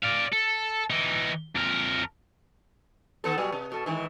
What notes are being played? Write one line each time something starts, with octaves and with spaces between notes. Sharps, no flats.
D5 F5
A4
E3 D#4
F2 A#4
D#3 B3 A4
B2 F#3 G3
C3
B2 A4
G#2 D#3 E3